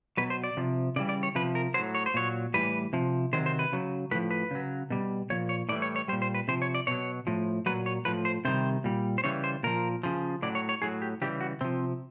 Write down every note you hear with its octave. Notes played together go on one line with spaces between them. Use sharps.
B2 F#3 B4
C5
D5
C3 F3
C#3 E3 G3 D5
D5
C#5
C3 F3 B4
A#4
A2 F#3 C5
C#5
C5
A#2 F#3 C#5
A2 E3 G3 B4
C3 F3
C3 D#3 F#3 C5
C5
B4
C#3 F#3
A2 F3 B4
B4
C#3 F#3
B2 G3
A#2 F3 C#5
C#5
A2 E3 G3 D5
C#5
C#5
A#2 G3 C5
C5
B4
C3 F3 C5
C#5
D5
B2 F#3 C#5
A2 F3
A#2 F#3 B4
C#5
A2 F3 B4
C5
C3 D#3 G3 C5
A#2 G3
C5
C#3 E3 G3 C#5
C5
A#2 F3 A#4
C#3 F3
A2 F#3 D5
C#5
C#5
A2 F#3 G#4
G4
C#3 E3 G3 G4
F#4
C3 F3 C4